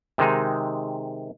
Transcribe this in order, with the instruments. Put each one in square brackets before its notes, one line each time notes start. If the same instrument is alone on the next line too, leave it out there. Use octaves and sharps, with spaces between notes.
[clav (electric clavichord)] C3 D#3 G#3 D#4